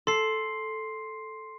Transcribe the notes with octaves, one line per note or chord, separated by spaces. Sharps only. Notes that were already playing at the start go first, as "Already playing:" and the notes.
A4 C6 C7